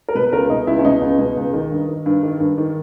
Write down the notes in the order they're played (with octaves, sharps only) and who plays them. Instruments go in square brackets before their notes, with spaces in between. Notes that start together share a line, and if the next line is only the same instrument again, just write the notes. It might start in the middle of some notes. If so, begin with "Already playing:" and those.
[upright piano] A#4
B2 B4
B4
C#2 A#4
B2 D#4
C#2 E4
C#4
B2 D#4
C#2
B2
C#2
D#3
G2
D#3
G2
D#3
G2
D#3